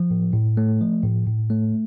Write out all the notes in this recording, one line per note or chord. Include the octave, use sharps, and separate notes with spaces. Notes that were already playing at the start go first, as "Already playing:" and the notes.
Already playing: F3
A2
A2
A3
F3
A2
A2
A3